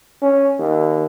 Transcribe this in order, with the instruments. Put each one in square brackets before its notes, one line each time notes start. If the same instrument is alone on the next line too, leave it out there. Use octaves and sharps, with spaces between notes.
[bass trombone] C#4
D#2